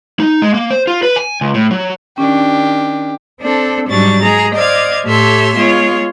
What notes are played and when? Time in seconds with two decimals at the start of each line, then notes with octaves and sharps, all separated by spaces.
0.20 D#4
0.42 G#3
0.54 A#3
0.71 C5
0.87 F4
1.03 B4
1.16 G#5
1.41 C#2
1.54 A2
1.71 F#3
2.18 D#3 C#4 D4 G4
3.42 C4 D4 A4
3.90 G#2 F#3 G3 D4 C#6 A6
4.22 G#3 G#4 A#5
4.55 C5 D5 D#5 F5 G#6
5.06 A2 G4 A4 C#5 E5 C6
5.58 G#3 B3 F4 C#5